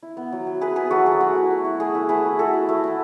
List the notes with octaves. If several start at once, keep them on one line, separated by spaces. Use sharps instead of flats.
E4
B3
F#3
F#3
E4 G#4 B4
B3 G#4 B4
F#3 F#4 A4
F#3 G#4
A3 F#4
E4
A3
E4
A3 G#4
E4
A3 G#4 B4
E4
A3 F#4 A4
E4
A3
E4